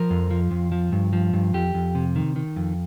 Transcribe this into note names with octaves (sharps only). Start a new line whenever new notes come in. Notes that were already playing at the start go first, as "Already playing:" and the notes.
Already playing: F3 A#4
F2
F3
F2
F3
G2
F3
G2
F2 G4
F2
C3
D#3
D#3
F2